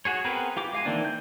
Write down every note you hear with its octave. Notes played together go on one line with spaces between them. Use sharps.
F#4 G#4 C#5
B3 C4 G#4 A#4 B4
F4 G4 D6
G#3 F5 G#5
D#3 E3 A#3 C4 D4
G6